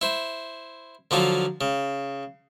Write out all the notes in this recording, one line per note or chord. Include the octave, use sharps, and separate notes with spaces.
E4 C5
D3 F3 F#3 F4
C#3